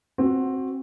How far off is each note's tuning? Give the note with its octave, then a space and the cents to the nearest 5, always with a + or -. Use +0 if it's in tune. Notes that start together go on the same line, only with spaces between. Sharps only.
C4 +15 F#4 +0